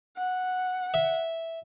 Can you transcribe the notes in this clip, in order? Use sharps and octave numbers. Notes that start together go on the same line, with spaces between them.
F#5
E5